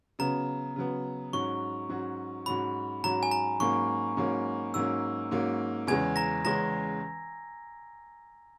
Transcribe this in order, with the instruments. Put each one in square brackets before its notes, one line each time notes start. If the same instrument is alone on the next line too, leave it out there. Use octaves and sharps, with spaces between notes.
[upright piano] C#3 F#3 B3 [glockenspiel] A#5
[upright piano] C#3 F#3 B3
[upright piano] G#2 F#3 C#4 F#4 [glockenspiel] C#6
[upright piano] G#2 F#3 C#4 F#4
[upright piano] G#2 F#3 C#4 F#4 [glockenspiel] B5
[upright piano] G#2 F#3 C#4 F#4 [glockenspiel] A#5
[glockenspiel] G#5
A#5
[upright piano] G#2 F#3 A#3 C#4 [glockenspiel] C#6
[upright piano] G#2 F#3 A#3 C#4
[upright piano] G#2 F#3 A#3 C#4 [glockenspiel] E6
[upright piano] G#2 F#3 A#3 C#4
[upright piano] E2 C#3 G#3 C#4 [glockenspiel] G#5 G#6
[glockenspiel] A#5 A#6
[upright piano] E2 C#3 G#3 C#4 [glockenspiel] A#5 A#6